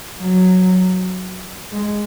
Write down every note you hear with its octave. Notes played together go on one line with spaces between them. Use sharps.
F#3
G#3